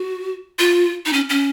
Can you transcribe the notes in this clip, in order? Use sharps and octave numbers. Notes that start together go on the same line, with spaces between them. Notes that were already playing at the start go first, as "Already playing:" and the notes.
Already playing: F#4
F4
D#4
C#4
C#4